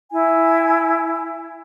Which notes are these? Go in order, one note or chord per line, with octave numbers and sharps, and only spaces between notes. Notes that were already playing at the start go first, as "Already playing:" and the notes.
E4 G#5